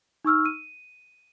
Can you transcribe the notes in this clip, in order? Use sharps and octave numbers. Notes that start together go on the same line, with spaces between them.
D#4 C#6 E6 F6
D#7